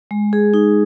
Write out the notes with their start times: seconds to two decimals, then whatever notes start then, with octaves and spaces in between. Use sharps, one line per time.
0.11 G#3
0.33 G#4
0.54 D#4